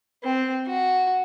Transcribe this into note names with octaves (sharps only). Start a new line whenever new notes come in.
C4
F#4